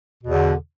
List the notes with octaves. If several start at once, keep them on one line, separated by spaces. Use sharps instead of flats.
E2 B2 D3